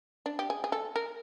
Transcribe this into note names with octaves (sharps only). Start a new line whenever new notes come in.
D4
G4
G#4
G#4
A4
A#4